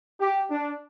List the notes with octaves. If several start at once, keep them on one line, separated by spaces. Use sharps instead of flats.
G4
D4